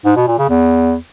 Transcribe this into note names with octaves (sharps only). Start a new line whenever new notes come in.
G#2
B2
A#2
C#3
E2